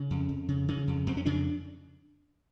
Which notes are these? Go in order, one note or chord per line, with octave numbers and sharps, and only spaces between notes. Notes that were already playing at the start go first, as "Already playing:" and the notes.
Already playing: C#3 C#4
F2
F2
C#3
C#3
F2
F2 C4
C#4
C#3 D4